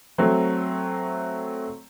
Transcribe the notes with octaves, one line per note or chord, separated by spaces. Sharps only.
F#3 A3 C4